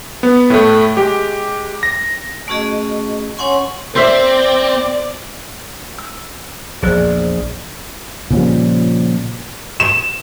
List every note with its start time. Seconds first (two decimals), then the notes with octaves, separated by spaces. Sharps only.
0.23 B3
0.50 A2 A3
0.97 G#3 G4
1.83 A#6
2.48 A3 C#4 F#4 G#4 D#5
3.37 C#4 C#5 F#5 G#5 C6 C#6
3.96 C4 C5 D5 E5
5.98 E6
6.82 A#1 E2 G#4 C5 D5
8.30 A#2 C#3 F3 G3
9.80 E7